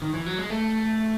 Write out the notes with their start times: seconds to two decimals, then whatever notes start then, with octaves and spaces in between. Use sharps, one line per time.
0.02 D#3
0.14 E3
0.26 F#3
0.38 G#3
0.50 A3